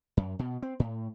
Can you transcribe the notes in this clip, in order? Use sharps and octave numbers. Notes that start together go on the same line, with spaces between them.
F#2
B2
C4
A2